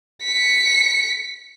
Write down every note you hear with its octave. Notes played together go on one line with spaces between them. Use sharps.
B6 C#7